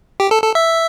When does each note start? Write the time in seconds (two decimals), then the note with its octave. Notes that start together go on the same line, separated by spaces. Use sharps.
0.20 G4
0.31 A4
0.43 A4
0.55 E5